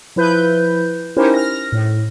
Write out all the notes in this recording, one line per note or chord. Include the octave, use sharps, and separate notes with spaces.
F3 E4 B4 G6
C#4 D#4 E4 G4 A#4 C5
F6 A#6
A2